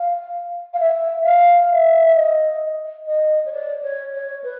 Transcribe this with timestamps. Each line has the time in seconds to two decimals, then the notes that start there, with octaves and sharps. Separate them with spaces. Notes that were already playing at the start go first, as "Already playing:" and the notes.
Already playing: F5
0.73 F5
0.79 E5
1.24 F5
1.70 E5
2.06 E5
2.15 D#5
3.06 D#5
3.45 C#5
3.52 D5
3.82 C#5
4.13 C#5
4.43 B4